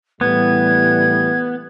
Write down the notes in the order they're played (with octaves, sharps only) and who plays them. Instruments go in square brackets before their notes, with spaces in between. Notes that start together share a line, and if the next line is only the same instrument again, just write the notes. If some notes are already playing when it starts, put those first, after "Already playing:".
[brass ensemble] A2 E3 G3 [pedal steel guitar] B3 [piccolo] G#6